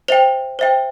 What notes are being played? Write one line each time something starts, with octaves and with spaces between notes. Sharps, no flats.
C5 E5 G5 F7
C5 E5 G5